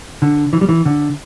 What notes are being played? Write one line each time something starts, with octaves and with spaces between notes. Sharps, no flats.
D3
E3
G3
E3
D3